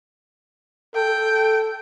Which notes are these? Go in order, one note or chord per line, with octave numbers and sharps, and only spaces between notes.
A4 G5